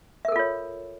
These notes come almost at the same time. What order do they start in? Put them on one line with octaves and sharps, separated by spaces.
E5 A#4 A4 F4 C#5